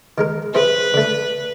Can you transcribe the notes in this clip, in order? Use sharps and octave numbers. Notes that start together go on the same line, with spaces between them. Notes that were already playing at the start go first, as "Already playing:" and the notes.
D#3 G#3 A#4
C4 E4 G#4 B4
D3 A3